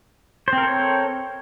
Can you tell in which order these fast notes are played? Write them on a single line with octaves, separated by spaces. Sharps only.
C5 C4 A#4 A4 C#5